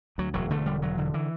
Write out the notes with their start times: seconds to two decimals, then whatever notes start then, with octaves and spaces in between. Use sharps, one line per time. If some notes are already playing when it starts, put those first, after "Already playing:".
0.18 D2 F#3
0.34 E1 F#3
0.50 D3 A3
0.66 E1 G3
0.82 E1 F#3
0.98 D3
1.14 E3